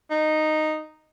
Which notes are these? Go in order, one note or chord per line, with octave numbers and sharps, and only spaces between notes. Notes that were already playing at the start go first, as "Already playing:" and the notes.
D#4